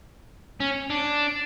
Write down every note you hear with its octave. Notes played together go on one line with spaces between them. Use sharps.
C#4
D4